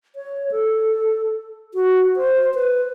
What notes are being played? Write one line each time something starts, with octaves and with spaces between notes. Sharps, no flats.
C#5
A4
F#4
C5
B4